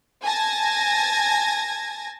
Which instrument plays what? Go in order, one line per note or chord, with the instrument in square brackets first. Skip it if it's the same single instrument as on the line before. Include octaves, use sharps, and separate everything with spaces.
[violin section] G#5 A5 G#6 A#6